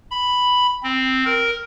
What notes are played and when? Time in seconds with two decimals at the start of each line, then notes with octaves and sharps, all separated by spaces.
0.11 B5
0.83 C4
1.25 A#4